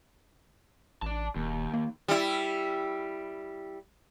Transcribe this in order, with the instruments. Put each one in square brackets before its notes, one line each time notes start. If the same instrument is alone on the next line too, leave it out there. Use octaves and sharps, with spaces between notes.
[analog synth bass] A1 [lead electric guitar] D5 A5
[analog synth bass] D#1 [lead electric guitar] D#2
[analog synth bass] A#3
[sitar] G3 E4